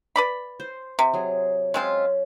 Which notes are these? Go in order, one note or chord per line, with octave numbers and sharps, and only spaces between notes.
B4 D5 B5
C5
C3
F#3 G#4
G#3 C4 C#4 F4 E5